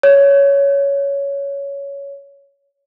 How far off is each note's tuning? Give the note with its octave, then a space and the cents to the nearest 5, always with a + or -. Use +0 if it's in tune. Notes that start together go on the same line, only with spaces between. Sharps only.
C#5 +10